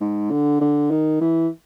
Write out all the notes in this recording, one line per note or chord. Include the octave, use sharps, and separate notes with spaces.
G#2
D3
D3
D#3
E3